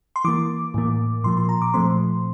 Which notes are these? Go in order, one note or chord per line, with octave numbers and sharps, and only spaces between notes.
C6
E3 A#3 D6
A2 E3 A#3
A#2 F3 A#3 C6
C6
A#5
D6
A#2 F3 A3 C4 C6